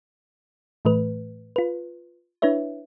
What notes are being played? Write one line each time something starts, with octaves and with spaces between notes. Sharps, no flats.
A2 E3 A3 B4
F4 B4
D4 E4 B4 C#5 E5